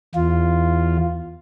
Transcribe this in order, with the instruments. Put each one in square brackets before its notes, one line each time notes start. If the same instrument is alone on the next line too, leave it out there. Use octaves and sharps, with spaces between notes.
[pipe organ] E2 F4